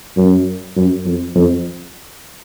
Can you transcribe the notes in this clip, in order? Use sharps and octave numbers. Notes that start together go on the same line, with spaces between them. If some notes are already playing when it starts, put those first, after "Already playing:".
F#2
F#2
F2
F2